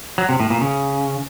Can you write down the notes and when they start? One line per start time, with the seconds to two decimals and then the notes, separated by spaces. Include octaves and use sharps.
0.18 F#3
0.29 C3
0.40 A2
0.50 A#2
0.61 C#3